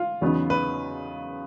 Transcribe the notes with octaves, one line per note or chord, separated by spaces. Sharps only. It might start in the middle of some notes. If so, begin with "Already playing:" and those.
Already playing: F4
E2 C#3 F#3 B3 D#4
B4